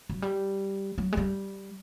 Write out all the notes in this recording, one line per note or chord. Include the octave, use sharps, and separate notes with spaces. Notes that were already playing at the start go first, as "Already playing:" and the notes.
F#3
G3
F#3
G#3
G3